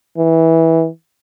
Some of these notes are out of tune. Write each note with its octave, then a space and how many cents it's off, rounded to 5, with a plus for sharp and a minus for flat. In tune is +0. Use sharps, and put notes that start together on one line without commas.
E3 -15